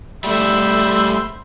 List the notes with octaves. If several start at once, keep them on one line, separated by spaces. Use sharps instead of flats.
G3 A3 C5 E5 B5